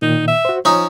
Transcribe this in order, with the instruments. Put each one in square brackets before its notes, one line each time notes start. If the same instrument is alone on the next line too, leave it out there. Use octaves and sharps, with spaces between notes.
[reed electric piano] A#2 D#3 [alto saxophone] D#4
[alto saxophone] E5
[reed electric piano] F#4 C5
[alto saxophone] F3 [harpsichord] C#4 D#4 [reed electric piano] C#5 A#5